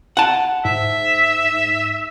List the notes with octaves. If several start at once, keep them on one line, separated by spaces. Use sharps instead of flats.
F#5 A5
G#2 E5